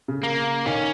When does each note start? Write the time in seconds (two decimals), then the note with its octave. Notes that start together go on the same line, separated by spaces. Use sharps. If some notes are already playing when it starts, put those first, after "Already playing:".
0.08 C#3
0.23 A#3
0.66 D#3 C#4